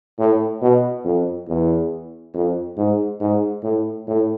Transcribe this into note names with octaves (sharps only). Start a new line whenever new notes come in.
A2
B2
F2
E2
F2
G#2
G#2
A2
A2